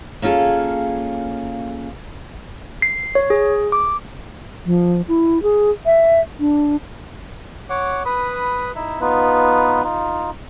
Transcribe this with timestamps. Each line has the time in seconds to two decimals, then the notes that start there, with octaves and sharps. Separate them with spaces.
0.22 A#3 C#4 F4 G#4 A4
2.82 C7
3.15 C#5
3.30 G#4
3.72 D6
4.66 F3
5.08 E4
5.43 G#4
5.86 E5
6.40 D4
7.70 C#5 F#5 D6
8.05 B4 B5 D#6
8.76 D#4 E4 E5
9.01 B3 D#4 F4 B4
9.84 D#4 F4